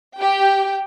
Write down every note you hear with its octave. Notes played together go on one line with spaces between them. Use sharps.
G4 G5